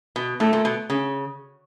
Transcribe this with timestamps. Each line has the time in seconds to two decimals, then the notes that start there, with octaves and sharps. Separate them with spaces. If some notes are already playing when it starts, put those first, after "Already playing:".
0.16 B2
0.40 A2 A3
0.53 A#2
0.65 B2
0.90 C#3